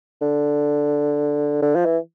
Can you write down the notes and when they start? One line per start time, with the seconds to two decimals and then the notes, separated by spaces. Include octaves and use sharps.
0.22 D3
1.62 D3
1.75 F3
1.86 E3